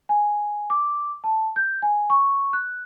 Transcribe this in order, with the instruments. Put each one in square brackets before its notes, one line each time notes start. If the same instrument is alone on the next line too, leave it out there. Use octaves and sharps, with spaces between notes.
[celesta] G#5
D6
A5
G6
G#5
C#6
F#6